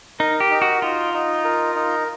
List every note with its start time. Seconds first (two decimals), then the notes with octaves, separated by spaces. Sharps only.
0.19 D#4 A#4
0.40 G4
0.51 D#4
0.62 F#4
0.82 D#4 F4
1.14 D#4
1.45 A#4
1.76 D#4